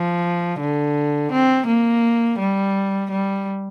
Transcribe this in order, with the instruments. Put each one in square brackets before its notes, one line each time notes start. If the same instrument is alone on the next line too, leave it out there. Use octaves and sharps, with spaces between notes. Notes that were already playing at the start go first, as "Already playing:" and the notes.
Already playing: [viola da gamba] F3
D3
C4
A#3
G3
G3